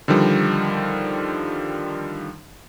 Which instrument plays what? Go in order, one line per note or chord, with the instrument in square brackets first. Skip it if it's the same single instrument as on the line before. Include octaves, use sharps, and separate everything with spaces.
[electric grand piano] D3 D#3 F3 G3